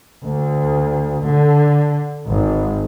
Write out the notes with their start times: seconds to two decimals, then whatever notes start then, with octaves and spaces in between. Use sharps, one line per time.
0.25 D2
1.29 D3
2.28 G#1